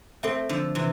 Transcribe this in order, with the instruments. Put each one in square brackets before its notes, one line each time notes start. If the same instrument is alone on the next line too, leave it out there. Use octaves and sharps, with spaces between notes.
[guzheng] A3 C4 [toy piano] A4 C5 E5
[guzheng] D3 F3
C3 E3